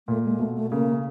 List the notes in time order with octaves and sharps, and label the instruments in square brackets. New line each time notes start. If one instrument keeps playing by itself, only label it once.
[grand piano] A#2 [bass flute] A3
[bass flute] G#3
[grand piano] B2 [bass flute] A3
[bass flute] A3
[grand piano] C#3 [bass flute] A#3